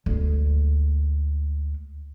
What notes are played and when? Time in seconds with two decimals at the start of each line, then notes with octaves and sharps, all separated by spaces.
0.06 D2 G#3